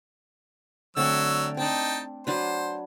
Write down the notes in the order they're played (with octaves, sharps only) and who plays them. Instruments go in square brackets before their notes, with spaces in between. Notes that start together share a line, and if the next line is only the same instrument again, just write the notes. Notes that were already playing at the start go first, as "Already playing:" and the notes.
[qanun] D3 A3 C4 [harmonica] F#3 C#5 E6
[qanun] C4 D4 [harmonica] D#4 G5 A5
[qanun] F#3 D4 B4 [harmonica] C5